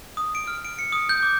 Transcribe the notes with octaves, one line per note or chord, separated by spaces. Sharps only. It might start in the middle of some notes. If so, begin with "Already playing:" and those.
D#6
D7
F6
D7
C#7
D#6
G6
D6